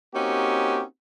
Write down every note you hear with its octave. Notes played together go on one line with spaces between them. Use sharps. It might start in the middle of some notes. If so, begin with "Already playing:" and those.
A#3 C4 C#4 D#4 F#4 G4